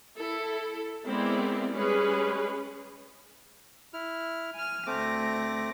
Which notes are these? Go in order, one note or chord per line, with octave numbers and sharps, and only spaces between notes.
E4 A4
G#3 B3 C4 E4 A#4 D5
G3 G#3 C#4 G#4 B4
E4 F6
G#5 F6
D2 A3 C4 D6 A#6